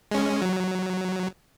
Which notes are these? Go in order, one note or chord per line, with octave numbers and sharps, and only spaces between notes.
G#3 C#4
F#3